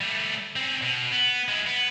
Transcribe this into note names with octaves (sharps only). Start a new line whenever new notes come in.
G3 A3
C4 C#4
B2
B3
G#3 E4
B3